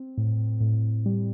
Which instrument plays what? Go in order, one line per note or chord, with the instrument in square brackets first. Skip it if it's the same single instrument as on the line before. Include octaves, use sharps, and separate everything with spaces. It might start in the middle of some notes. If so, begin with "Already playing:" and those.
Already playing: [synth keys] C4
A2
A2
G3